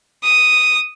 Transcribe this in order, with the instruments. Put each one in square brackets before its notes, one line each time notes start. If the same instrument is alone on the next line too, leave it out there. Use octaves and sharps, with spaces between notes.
[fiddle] D#6